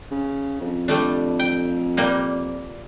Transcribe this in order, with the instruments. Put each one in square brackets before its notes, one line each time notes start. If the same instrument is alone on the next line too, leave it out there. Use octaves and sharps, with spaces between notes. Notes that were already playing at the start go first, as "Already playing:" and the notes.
[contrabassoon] C#3
F2
[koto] G3 A3 D4
G5
A#2 G3 A#3